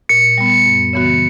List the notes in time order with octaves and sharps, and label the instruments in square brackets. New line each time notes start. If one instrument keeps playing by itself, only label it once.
[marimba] A#2 [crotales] C#7
[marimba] G3 B3
F#2
C#3 E3 B3 F#4